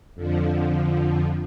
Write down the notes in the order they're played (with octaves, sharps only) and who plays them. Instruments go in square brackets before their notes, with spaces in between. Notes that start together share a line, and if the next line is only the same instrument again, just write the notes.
[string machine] F2 D3 F3